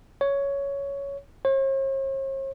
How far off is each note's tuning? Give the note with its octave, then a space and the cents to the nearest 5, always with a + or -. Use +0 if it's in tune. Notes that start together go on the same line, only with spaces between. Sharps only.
C#5 +10
C#5 -45